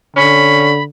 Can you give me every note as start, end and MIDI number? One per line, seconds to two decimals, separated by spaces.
0.16 0.88 50
0.16 0.72 61
0.16 0.83 83